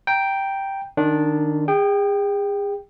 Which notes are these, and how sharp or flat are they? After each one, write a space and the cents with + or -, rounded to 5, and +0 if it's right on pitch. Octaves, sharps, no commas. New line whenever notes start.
G5 +0 A#5 +5
D#3 -25 D4 -10
G#4 -35 G5 +0